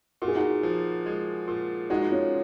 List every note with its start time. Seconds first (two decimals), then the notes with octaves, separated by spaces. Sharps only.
0.22 A#2 F#4
0.28 G#4
0.35 D#4 F#4
0.63 F3
1.06 G#3
1.48 A#2
1.90 G#3 D#4 F#4
2.11 C#4 F4